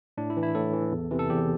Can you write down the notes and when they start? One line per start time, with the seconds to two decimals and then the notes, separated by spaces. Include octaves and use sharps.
0.18 A2 D4
0.30 E4
0.37 E3
0.43 E4
0.55 A2 A4
0.73 E3
0.92 E2
1.11 C3 E3
1.19 A4
1.29 E2 G4